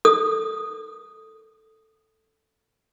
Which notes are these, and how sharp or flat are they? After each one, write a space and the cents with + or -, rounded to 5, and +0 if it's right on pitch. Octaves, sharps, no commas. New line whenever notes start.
A4 +0 D#6 +0